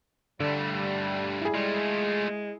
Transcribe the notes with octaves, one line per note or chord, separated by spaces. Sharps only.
G2 D3 G3 A3
E4 G#4
G#3 A3 F4